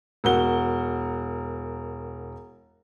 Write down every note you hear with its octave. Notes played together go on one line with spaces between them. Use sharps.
E1 F#4 A#4 G7